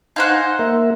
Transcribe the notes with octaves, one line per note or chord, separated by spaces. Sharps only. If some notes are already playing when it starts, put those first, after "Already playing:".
D#4 C5 F5 F#5 G#5
A#3 A#4 E5